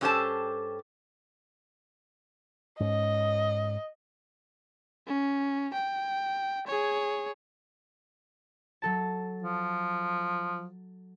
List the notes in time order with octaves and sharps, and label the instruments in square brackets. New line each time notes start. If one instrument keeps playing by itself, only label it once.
[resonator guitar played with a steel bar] G2 C#4 G4 A4 C5 A5
[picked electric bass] G#2 C#4 [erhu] D#5
[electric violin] C#4
G5
G#4 C#5
[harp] F#3 A4 A5
[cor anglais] F3